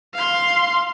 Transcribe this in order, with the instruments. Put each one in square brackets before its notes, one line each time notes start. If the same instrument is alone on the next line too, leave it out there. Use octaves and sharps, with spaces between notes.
[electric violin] F5 C6